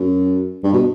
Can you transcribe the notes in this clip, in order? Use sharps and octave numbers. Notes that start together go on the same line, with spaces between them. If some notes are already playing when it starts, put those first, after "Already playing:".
Already playing: F#2
G2
B2